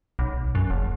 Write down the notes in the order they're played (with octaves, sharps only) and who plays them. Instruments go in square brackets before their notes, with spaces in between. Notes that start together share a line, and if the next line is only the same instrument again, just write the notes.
[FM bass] B1
F#2
F#1